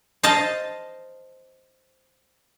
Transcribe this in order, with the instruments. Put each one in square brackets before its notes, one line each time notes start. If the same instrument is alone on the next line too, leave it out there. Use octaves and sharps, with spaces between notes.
[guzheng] C5 D#5 F5 A5